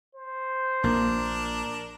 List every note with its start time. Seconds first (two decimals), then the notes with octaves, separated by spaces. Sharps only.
0.15 C5
0.84 A#1 A#3 D4 A#4